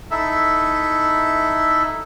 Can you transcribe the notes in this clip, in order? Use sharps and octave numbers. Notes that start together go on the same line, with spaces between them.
D#4 E4 A4 E5